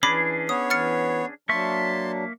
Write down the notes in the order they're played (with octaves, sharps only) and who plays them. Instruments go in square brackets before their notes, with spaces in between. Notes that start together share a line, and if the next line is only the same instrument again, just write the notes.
[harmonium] E3 [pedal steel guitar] C#4 D4 G#4 [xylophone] B5 D6
[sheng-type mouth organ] B3 C#5 [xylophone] D#6
[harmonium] E3 [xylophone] F6 A6 C#7
[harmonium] F#3 D4 [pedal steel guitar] A#3 E5 C#6 [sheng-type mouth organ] A5 C6